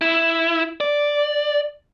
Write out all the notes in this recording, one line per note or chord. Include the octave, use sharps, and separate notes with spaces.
E4
D5